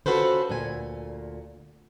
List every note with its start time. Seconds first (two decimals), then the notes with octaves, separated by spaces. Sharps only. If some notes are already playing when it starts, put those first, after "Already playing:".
0.06 C#4 F4 F#4 A4 B4 C5
0.50 D2 A#2 G#5